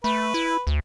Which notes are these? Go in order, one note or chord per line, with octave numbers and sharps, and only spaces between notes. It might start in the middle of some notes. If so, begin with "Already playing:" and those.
A3 B4
E4
D2